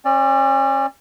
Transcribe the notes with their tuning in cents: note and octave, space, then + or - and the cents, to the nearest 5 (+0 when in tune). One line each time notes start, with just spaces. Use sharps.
C#4 -35 D5 +0